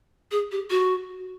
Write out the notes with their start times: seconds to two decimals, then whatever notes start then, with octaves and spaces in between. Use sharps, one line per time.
0.31 G#4
0.52 G4
0.70 F#4